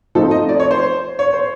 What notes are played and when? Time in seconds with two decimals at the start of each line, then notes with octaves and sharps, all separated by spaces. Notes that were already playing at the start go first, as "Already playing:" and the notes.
0.15 F3 A3 C4 D#4 A4
0.31 D#5
0.49 D5
0.60 C#5
0.71 C5
1.19 C#5
1.33 C5